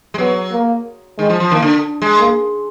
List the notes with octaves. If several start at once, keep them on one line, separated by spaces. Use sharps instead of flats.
G#3
F#3 B3
A#3
D#3 G#3
F3
F3
D#3 A#3
D3
G#3
A#3